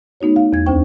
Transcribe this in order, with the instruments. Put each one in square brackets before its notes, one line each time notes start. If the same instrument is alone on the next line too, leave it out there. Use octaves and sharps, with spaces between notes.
[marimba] A3 B3 D#4 F#4 C#5
F5
E2 G#6
D2 C4 D4 C5 G5 C#6